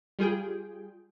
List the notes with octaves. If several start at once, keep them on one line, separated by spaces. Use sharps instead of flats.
G3 F4 G#4 G5